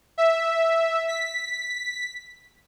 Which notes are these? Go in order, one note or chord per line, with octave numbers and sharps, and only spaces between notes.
E5
B6